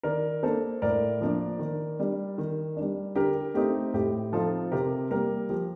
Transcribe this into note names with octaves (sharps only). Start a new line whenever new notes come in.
D#3 A#4 D5
A#3 D4 A4 C5
A2 A#4 D5
F3 A#3 D4
D#3
G3 D4
D#3
G3 D4
D3 G4 A#4
A3 C4 D#4 G4
A2 G4
F3 C4 D#4 F4 A4
C3 G4 A#4
G3 A#3 G4 A#4
F3 G4